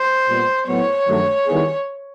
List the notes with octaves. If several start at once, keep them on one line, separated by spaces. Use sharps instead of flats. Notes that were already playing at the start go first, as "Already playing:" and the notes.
Already playing: C5
A#2 G3 B3
A2 F#3 B3 C#5
G2 D#3 F#3 A3
D#3 G3 B3 E4 G#4